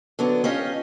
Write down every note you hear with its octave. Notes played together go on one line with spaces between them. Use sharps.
D3 F#3 B3 D4
C#4 F4 G4 D#5